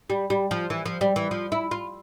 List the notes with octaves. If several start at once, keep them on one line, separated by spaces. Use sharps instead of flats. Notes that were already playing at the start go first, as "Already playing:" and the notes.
G3
G3
F3
E3
F3
G3
E3
F3
E4
F4